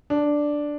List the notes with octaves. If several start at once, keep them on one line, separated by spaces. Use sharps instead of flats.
D4